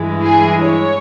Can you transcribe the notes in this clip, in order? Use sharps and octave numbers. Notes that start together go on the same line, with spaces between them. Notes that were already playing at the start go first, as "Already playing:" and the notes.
Already playing: G2 E3 G#3
G#4
C#5